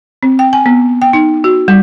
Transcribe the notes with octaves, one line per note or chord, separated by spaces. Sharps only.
C4
G5
G#5
B3
G5
D#4
F#4
G3